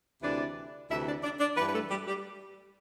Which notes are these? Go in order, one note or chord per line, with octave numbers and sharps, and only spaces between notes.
D2 C3 E3 D4 D5
D2 C3 E3 E4 E5
D4 D5
D4 D5
D4 D5
G2 E3 B3 B4
B4
A3 A4
G3 G4
G3 G4